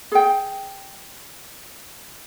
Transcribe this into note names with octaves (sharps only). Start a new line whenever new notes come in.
G#4 G5